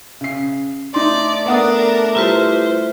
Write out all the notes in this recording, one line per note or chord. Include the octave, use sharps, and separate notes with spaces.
C#3 C7
A3 D#4 D5 C6
B3 D4 A#4 F#5 D#6
G3 E4 F4 B4 C5 E7